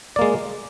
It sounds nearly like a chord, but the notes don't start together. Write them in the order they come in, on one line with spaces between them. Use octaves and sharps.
D5 A#3 G#3